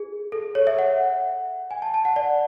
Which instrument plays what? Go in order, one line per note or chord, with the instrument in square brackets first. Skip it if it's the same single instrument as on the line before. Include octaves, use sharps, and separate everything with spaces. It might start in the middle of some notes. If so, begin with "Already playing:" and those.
Already playing: [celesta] G#4
A4
C#5
E5
F#5
G#5
A5
A5
F#5
D5